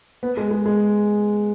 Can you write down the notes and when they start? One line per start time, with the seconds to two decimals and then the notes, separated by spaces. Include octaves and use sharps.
0.23 B3
0.37 G#3
0.51 G#3
0.66 G#3